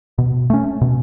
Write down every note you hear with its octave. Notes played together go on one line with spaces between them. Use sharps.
B2
A3 C#4
B2